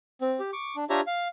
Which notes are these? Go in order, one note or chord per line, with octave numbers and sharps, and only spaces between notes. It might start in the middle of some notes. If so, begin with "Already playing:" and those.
C4
G4
C#6 D6
D4
D4 F4 G4 C#5 E5 A#5
F5